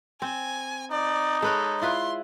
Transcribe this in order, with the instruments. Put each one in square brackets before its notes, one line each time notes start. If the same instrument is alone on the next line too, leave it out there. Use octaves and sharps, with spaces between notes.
[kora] C4 [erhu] G#5
[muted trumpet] D#4 [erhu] D5
[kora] G#3 B4 C#5 [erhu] A4
[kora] E4 F4 B4 [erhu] C6